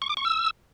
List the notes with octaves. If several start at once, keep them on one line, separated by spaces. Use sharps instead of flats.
C#6
D6
C#6
E6